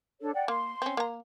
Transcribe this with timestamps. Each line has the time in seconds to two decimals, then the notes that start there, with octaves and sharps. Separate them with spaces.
0.21 D4 A4 C#5
0.34 D5 F#5 G5
0.48 A#3 C6
0.82 C4 C#4
0.97 A#3 A#5